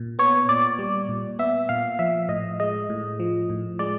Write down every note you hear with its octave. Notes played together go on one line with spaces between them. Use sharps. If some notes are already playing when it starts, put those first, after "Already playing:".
Already playing: A#2
B3 C#5
A#2 D5
G3
A#2
B3 E5
A#2 F5
F3 E5
A2 D#5
G#3 D#5
A2
F3
A2
G#3 D5